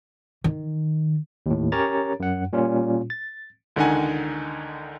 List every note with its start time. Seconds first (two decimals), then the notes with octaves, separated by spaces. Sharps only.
0.44 D#3
1.46 D#2 A2
1.72 C#4 G4 A#4 C#5 A#5 A6
2.20 F#2 F#5
2.53 A#2 G3 C#4 F4
3.10 A6
3.76 C#2 D3 D#3 D#4 F#5 G#5